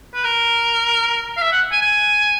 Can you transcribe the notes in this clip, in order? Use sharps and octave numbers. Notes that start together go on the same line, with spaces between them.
B4
A#4
F5
E5
F#5
G#5
G#5